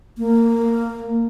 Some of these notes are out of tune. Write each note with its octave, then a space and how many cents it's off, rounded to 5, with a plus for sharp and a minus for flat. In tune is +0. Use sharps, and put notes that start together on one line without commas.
A#3 -10